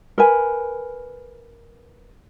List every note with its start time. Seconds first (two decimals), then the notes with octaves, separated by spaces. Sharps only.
0.18 A#4 B4 G#5